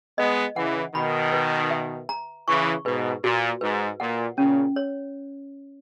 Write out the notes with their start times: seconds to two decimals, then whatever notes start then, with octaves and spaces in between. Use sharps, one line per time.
0.17 G#3 B3 D#5
0.56 C#3 E3 F#5
0.94 B2 D#3 B5
1.33 B4
1.71 E5
2.09 A#5
2.47 C#3 E3 C#6
2.85 G#2 B2 B4
3.24 A#2 F#4
3.61 G#2 B4
4.00 A#2 F#5
4.37 A#2 C#3 C#4
4.76 C#5